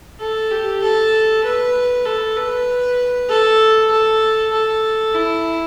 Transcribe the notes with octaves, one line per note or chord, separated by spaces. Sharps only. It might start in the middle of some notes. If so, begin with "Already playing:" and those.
A4
G4
A4
B4
A4
B4
A4
A4
A4
E4